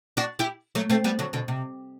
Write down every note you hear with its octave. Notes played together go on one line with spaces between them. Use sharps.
D4 F#4
E4 G4
F#3 A3
A3 C4
G3 B3
D3 F#3
B2 D3
C3